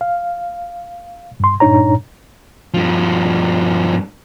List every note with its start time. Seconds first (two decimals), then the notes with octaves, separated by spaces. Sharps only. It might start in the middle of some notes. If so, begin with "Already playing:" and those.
0.01 F5
1.40 G2 C6
1.60 G2 A#2 D4 D#4 C#5 A#5
2.74 G2 F3